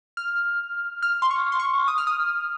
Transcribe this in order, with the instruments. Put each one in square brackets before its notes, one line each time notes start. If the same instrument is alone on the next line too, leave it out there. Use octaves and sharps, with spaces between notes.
[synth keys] F6
F6
C6
C#6
C6
C#6
D#6
F6
D#6